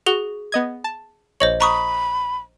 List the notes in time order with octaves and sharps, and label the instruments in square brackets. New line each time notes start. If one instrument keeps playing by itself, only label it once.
[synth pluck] F#4 [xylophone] G#4 G7
[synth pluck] B3 D#5 G#6
A5
[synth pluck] A#1 C#5 [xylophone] C5 D#5 F#7
[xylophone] A#5 C#6 D#6 [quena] B5